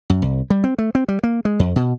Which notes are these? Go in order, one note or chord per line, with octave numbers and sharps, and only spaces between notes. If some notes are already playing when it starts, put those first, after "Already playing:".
F#2
C2
G3
C4
A3
C4
G3
A#3
G#3
F2
B2